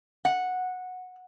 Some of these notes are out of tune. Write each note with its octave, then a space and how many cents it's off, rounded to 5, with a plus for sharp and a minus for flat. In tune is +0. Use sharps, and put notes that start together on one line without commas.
F#5 -10